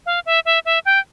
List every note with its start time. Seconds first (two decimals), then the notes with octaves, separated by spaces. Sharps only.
0.06 F5
0.26 E5
0.45 E5
0.65 E5
0.85 G5